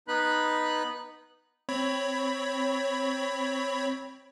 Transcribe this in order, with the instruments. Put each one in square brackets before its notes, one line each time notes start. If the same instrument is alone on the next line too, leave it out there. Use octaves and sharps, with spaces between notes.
[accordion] B3 D#4 B4 B5 F#6
[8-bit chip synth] C4 C#5 B5